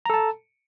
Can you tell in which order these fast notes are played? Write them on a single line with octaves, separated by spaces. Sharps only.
A#5 A4 A5